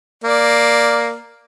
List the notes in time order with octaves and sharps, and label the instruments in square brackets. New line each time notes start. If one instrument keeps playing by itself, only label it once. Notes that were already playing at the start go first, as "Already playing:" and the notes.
[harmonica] A#3 D5